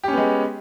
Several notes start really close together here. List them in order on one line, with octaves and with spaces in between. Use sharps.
G4 C#4 B3 G#3